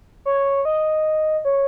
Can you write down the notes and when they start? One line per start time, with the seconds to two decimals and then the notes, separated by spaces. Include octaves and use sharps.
0.25 C#5
0.65 D#5
1.45 C#5